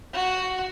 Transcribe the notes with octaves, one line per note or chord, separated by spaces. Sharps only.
F#4